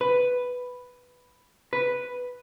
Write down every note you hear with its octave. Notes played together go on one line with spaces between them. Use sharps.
B4
B4